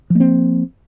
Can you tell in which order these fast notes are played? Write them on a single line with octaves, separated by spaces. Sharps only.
F3 A#3 C4